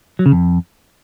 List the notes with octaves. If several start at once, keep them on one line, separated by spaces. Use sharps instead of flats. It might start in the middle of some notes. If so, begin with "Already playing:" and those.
F#3
C#3
F2